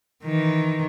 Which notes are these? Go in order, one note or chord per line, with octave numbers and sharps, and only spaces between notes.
D#3 E3